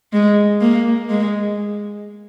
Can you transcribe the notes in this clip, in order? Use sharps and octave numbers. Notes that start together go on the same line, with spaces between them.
G#3
A#3
G#3